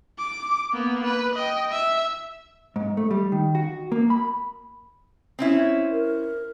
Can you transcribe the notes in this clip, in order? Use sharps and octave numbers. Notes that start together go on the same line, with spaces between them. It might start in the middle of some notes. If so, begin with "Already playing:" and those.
D6
A#3 B3
B4
D#5 G5
E5
G#2
A3
G3
D#3
F#4
A#3
B5
C4 C#4 E4
A#4